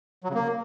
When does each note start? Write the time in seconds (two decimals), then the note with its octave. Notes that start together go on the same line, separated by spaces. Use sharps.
0.24 F#3
0.29 C#3
0.35 A#3